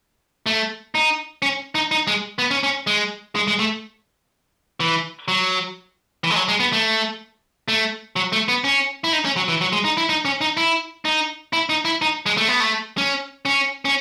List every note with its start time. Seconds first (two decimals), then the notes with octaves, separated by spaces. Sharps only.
0.46 A3
0.95 D#4
1.42 C#4
1.75 D#4
1.91 D#4
2.07 G#3
2.39 B3
2.51 C#4
2.63 C#4
2.87 G#3
3.35 G#3
3.48 G#3
3.59 A3
4.80 E3
5.28 F#3
6.24 E3
6.30 G#3
6.36 F#3
6.48 G#3
6.60 B3
6.73 A3
7.68 A3
8.16 F#3
8.32 A3
8.48 B3
8.64 C#4
9.04 E4
9.13 D#4
9.25 C#4
9.36 F#3
9.48 E3
9.61 F#3
9.73 G#3
9.84 D#4
9.97 E4
10.09 D#4
10.25 C#4
10.41 D#4
10.57 E4
11.05 D#4
11.53 E4
11.69 D#4
11.85 E4
12.02 D#4
12.26 G#3
12.37 A3
12.48 B3
12.60 A3
12.98 C#4
13.45 C#4
13.85 C#4